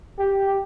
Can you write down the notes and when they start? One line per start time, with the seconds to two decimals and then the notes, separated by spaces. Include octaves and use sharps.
0.19 G4